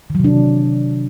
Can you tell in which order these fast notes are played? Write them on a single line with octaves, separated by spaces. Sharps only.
D#3 F#3 C3 D4 E3